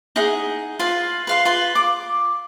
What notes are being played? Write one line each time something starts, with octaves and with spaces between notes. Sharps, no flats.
D#4 E4 G#4 F#5
F4 B4 F5
B4 F5 C6
F4 B4 C6
D6